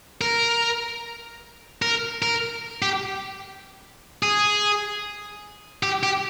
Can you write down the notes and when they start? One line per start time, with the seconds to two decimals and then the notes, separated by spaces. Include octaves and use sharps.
0.21 A#4
1.82 A#4
2.22 A#4
2.82 G4
4.23 G#4
5.83 G4
6.03 G4